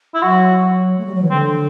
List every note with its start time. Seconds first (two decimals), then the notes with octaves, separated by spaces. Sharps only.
0.14 E4
0.22 F#3 F#4
0.97 A3
1.06 G3
1.14 F#3
1.22 E3
1.30 D3 C4